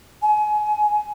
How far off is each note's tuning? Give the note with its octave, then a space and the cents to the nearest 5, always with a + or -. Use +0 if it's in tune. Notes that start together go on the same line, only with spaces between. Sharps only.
G#5 +25